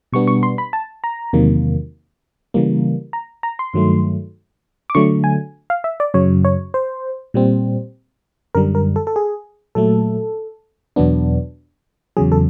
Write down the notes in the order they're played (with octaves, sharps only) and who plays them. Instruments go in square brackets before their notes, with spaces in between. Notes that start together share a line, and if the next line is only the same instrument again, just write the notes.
[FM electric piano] B2 G3 B3 D4 C#6
C#6
C6
B5
A5
A#5
E2 C3 D#3 F#3 A#3
C#3 E3 G3 A#3
A#5
A#5
C6
G2 D#3 F#3 A3
D6
D3 F#3 A3 C#6
G#5
F5
E5
D5
F#2 C#3 F#3 C#5
C#5
C5
A#2 G3 C4
F#2 D3 G3 A#4
A#4
A4
A4
G#4
A#2 F#3 A3 A4
E2 B2 F#3 B3 D4
E2 C#3 F#3 G#4
A4